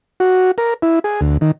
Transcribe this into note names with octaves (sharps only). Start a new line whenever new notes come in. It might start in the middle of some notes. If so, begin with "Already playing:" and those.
F#4
A#4
E4
G#4
D2
D#3